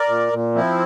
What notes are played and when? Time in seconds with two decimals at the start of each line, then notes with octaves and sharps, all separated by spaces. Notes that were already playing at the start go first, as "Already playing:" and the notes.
Already playing: A#4 D5
0.08 A#2
0.33 A#2
0.55 F3 C4 E4